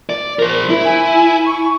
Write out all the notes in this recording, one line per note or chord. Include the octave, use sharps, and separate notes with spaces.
D5
A#4 C5
E4
G#5
C#6